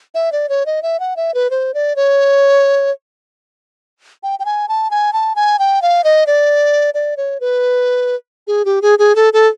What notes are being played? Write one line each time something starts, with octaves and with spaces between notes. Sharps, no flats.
E5
D5
C#5
D#5
E5
F#5
E5
B4
C5
D5
C#5
G5
G5
G#5
A5
G#5
A5
G#5
G5
F5
D#5
D5
D5
C#5
B4
G#4
G4
G#4
G#4
A4
A4